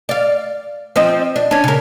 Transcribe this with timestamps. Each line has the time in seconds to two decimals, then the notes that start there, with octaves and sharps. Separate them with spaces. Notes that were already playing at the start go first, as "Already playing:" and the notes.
0.09 D5 F5
0.96 F3 C4 D#5
1.36 D4
1.51 C#4 D4
1.64 C#3 A#4